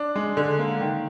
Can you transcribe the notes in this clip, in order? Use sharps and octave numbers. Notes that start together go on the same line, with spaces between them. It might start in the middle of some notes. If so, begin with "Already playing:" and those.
Already playing: D4
G#3
D3
A#3
D#3